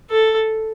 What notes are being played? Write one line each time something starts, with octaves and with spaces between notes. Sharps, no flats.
A4